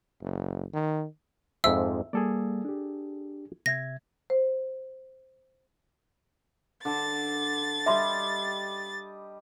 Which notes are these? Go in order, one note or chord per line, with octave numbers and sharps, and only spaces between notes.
F#1
D#3
F2 G#2 F3 E5 E6
G3 A#3 G#4 A4 D5
D4 G4
C3 E5 G#6 A#6
C5
D3 A5 A6
G3 G4 D#5 E5 C6